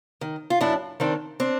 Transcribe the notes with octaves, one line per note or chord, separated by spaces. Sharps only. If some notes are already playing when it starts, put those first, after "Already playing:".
D#3
F4
F#2 D4 E4
D#3 C4 D4
C4 D4